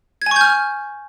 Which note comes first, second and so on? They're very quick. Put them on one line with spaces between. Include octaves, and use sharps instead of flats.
G#6 G#5 C#6 G6 F6